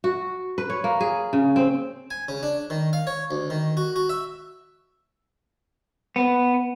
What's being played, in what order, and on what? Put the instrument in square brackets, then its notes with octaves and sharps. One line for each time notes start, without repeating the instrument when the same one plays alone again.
[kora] F#4
B4
C#5
A#3
G#4
C#3
C4
[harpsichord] G#5
C#3
D4
D#3
F5
C#5
D2
D#3
F#4
F#4
E5
[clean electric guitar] B3